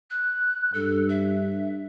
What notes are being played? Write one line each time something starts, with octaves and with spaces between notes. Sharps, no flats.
F#6
G2 A4
E5